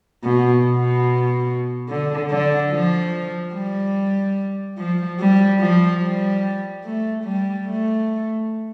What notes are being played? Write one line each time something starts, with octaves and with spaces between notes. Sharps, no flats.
B2
B2
D3
D3
F3
G3
F3
G3
F3
G3
A3
G3
A3